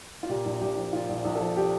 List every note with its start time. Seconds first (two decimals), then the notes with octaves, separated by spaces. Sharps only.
0.23 F4
0.29 A#2 G4
0.45 A#1
0.61 A#1 G4
0.77 F3
0.93 A#2 F4
1.09 A#1
1.25 A#1
1.35 A4
1.40 F3
1.57 A#2 G4